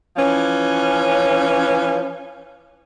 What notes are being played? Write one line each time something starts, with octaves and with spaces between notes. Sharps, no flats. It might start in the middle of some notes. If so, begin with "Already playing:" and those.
E3 F3 C#4